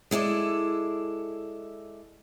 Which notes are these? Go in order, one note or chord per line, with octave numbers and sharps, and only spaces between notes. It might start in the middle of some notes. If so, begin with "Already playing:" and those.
G#3 E4 A4 D5